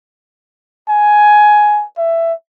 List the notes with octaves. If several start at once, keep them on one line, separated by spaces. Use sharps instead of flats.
G#5
E5